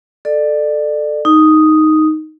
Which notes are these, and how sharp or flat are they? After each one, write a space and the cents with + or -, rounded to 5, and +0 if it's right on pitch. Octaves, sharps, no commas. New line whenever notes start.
A4 +0 D5 +25
D#4 +0 D#6 +0